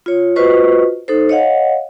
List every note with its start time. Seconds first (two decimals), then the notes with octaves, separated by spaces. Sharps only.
0.06 F4 C#5
0.36 F4 F#4 B4 C5 D#5 C#6
1.08 D#4 A4 C5
1.29 C#5 D#5 F5 F#5